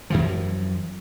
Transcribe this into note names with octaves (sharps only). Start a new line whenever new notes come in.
F#2 E3 F3